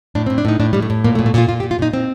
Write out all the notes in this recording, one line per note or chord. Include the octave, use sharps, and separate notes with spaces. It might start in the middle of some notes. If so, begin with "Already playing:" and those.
A2 D4
A2 C4
D4
A2 D#4
A2 D4
A2 G3
A3
A2
A#2 A#3
A3
A#2
A3
A#2 F4
A#2 F4
G4
A#2
F4
A#2 D#4
A#2 C4